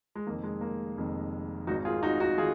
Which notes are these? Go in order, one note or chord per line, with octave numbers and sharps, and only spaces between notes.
G#3
F1 F2 D#3 A#3
G#3
A#3
F1 F2 D#3
G#1 G#2 D#3 D#4 F#4
F4 G#4
D#4 F#4
D#4 F#4
D#3 F4 G#4